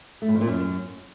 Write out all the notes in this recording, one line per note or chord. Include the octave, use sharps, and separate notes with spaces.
A3
A2
F2
A#2
F#2